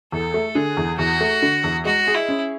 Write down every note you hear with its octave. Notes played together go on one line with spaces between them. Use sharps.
E2 A4
A3
D3 G#4
E2
E2 F#4
A3
D3
E2
G#3 F#4
G#4
E4
C#4